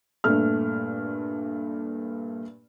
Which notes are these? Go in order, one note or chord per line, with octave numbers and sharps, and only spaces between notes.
G2 A#2 A3 F6